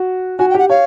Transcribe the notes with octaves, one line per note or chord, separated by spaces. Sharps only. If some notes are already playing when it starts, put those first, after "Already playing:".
Already playing: F#4
F#4 G#5
G5
G4 F#5
C#5 F5